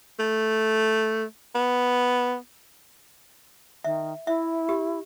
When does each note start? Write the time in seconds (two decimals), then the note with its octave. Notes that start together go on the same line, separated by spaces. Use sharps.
0.19 A3
1.55 B3
3.84 D#3 E5
4.27 E4 E5
4.69 G4